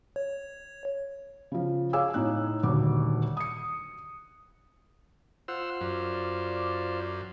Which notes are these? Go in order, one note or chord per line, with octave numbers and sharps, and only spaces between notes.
C#5
C#3 F3
G#4 C#5 F5 G#5 D6 E6
A2 D#4 F#6
D#1 D2 D#3 F#3 D6
D#6 C#7
F4 C5 F#5 E6
F#2 D5